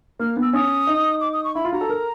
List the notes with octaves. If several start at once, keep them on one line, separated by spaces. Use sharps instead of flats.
A#3 F6
B3
E6
C#4 D#6
D#4
D6
D#6
C#6
E4 B5
F4
F#4 A#5
A4
A#4